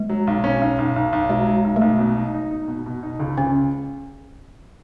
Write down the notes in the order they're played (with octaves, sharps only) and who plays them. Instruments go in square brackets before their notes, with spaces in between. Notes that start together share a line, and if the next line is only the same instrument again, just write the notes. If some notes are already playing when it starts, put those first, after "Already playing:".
Already playing: [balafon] G#3
[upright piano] F#3
B1
C#4
B1
B1
B1
B1
[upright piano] F#3 [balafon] G#3
[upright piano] F#3
B1
[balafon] A3
[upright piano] B1
B2
D#4
D#4
D#4
B2
B2
D#4
C#2
[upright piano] C#2 [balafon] C#4